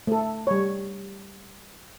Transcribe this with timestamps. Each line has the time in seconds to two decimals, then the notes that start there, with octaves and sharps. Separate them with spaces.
0.07 A3 A4
0.47 G3 C#5